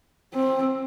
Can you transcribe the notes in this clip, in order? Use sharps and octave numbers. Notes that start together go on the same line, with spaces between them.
C4